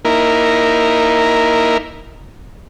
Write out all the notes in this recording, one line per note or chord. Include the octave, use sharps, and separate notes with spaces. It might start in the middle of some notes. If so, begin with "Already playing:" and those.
A#3 D#4 E4 A#4